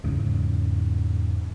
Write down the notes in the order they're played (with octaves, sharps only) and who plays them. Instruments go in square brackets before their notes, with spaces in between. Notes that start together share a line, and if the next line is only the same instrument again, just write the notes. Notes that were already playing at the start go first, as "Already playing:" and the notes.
[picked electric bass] E2 G#2 C#3